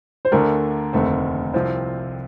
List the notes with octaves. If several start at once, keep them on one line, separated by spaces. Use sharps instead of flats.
C5
D2 D3 A3 D4 A#4
F1 D#2 D3 A3 C4
C2 C3 F3 C4 F4 C5